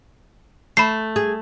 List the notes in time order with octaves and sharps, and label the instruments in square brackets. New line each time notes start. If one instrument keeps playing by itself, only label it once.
[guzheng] A3 [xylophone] B5 C7
[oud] G#4